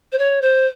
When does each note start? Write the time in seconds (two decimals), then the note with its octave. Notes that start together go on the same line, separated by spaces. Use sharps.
0.12 C5
0.18 C#5
0.42 C5